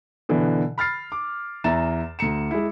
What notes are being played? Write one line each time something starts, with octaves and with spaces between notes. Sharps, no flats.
B2 D3 E3
B5 F6 A6 C7
D6
E2 E5 A#5 A6 E7
D2 A#5 C#7 E7
G#3 E4